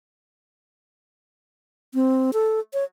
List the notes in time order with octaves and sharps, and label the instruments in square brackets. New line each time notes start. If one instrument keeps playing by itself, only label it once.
[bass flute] C4
A4
C#5